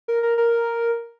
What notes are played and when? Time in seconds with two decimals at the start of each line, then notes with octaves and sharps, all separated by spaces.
0.08 A#4
0.23 A#4
0.38 A#4